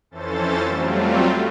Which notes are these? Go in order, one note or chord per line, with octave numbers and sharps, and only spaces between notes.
F2 E3 C#4 A4 C5 A6
F#3 G3 A3 C4 F4